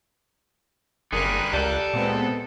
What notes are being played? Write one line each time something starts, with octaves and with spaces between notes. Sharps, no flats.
F#1 D3 G3 G#4 A#4 F#6
C#2 G3 A4
A#2 G#3 B3 C4